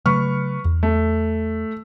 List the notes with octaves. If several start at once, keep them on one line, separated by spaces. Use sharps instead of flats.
C#3 F#3 A3 B4 C#6 F6
E2
A3